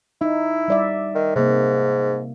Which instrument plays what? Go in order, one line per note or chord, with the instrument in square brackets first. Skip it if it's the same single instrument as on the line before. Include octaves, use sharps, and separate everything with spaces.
[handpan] D#4 [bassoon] E4
[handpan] G3 D5 E5
[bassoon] D#3
[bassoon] G#2 [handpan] C3 A#3